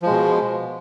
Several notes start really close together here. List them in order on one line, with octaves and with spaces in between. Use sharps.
F3 G#3 B2